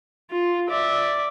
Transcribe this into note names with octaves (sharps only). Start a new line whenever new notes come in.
F4
D5 E5